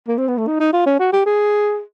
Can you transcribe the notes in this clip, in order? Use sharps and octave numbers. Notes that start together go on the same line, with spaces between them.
A#3
C4
B3
A3
D#4
D#4
F4
C#4
F#4
G4
G#4